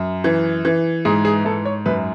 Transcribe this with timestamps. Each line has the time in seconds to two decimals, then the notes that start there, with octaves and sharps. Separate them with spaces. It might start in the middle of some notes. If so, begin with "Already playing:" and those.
Already playing: F#2
0.24 E3
0.65 E3
1.05 G#2 G#4
1.25 G#4
1.45 G#2 A4
1.65 C#5
1.86 F#2 B4